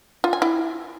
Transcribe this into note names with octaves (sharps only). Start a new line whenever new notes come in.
F4
G#5
E4